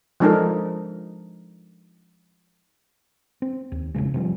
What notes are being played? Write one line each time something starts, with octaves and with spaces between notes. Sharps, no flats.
F3 G#3 D4 D#4 A4 A#4
C4
D#2
A#1 F2 C#3 G#3
C3 F3 G3